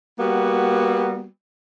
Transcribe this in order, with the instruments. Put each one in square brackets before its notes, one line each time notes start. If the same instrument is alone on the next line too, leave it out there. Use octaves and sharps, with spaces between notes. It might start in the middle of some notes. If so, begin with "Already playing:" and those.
[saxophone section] G3 A#3 B3 F#4